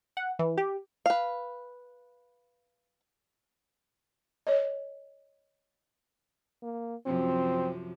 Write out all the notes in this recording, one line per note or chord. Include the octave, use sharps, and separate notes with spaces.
F#5
E3
G4
B4 F5
C#5 D#5
A#3
F#2 C3 F3 C4